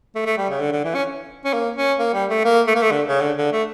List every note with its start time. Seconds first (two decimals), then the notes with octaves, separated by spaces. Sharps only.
0.15 A3
0.26 A3
0.38 G3
0.50 C#3
0.60 D3
0.72 D3
0.84 E3
0.95 C#4
1.45 C#4
1.53 A#3
1.76 C#4
1.99 A#3
2.14 G3
2.29 A3
2.45 A#3
2.67 A3
2.75 A#3
2.82 A3
2.91 D3
3.07 C#3
3.21 D3
3.37 D3
3.52 A3